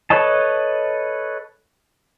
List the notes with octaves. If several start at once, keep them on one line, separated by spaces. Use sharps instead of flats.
A4 B4 C#5 D#5 A5